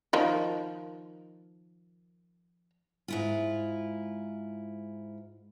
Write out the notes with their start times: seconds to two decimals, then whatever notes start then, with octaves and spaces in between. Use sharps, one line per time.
0.13 D#3 F3 A#4
3.08 G#2 E4 F4